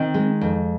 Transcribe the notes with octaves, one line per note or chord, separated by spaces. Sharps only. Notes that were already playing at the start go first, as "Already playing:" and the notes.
Already playing: D#3 C4
G#3
F2